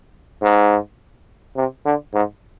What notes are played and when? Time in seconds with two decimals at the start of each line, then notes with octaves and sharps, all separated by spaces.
0.42 G#2
1.56 C3
1.85 D3
2.14 G#2